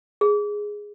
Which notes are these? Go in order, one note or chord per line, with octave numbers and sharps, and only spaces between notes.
G#4